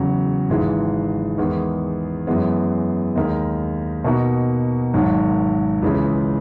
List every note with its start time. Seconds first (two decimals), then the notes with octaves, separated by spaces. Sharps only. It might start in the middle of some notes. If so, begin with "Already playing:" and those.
Already playing: E2 C#3 F#3 C#4 F#4
0.49 G#1 G#2 E3 G#3
1.38 E2 D#3 G#3 B3
2.27 F#2 E3 G#3 B3
3.15 D#2 D#3 G#3 D#4 A#4
4.04 B2 A#3 D#4 F#4
4.94 G#1 G#2 D#3 F#3
5.82 C#2 C#3 E3 G#3